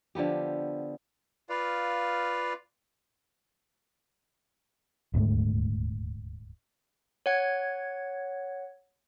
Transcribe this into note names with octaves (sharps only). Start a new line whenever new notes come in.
D3 F3 B3 G4
F4 B4 D5 F5
D#1 D2 G#2 A3
C#5 F#5 G#6